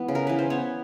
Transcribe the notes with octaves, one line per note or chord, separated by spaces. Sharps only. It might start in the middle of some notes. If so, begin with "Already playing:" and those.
Already playing: E3 B3
C#3
A#4
E3 B4
C5
B3 C#5